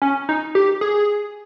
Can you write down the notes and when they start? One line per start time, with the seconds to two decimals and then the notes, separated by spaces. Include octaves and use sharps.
0.02 C#4
0.29 D#4
0.55 G4
0.81 G#4